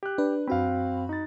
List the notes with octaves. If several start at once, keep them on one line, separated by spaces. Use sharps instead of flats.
G4 F#6
D4 B4
F#2 C4 F#4 F5 B5
D#4 A6